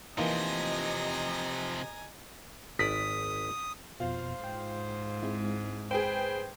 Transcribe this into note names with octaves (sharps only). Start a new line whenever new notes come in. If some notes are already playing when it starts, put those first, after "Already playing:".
C3 E3 F3 A#3 D#4 D#5 G#5 A#5
G#1 D5 D#6 B6
F2 B2 F4 C5
G#2 G5
G#3 C4 E4
G#4 B4 C5 G5